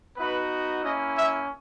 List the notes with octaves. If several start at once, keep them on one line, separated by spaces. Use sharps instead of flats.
B3 D#4 F#4 B4
A#3 C#4 E4 D#5
E5